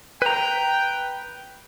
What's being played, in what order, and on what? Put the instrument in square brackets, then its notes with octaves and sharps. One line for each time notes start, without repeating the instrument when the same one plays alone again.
[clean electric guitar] B4 A#5 [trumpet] G5